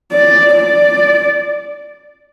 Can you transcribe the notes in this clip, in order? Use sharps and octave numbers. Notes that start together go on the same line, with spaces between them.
D5
D5